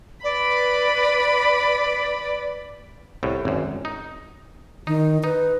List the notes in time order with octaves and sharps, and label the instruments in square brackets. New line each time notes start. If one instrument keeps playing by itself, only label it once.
[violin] B4 B5 [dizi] D5
[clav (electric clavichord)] C2 A2
G#1 F#2
D#4
[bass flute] D#3 [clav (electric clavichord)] D#4
[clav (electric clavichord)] D#4 [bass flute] B4